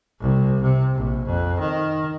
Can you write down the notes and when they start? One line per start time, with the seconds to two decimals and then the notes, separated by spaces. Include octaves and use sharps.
0.21 C2
0.63 C3
0.95 A#1
1.26 F2
1.59 D#3